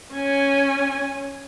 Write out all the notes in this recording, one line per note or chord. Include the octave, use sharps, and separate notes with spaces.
C#4 G#5